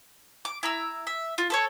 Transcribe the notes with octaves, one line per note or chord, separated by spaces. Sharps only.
D6
E4 A#5 E6
E5
F4
A4 B4 C#5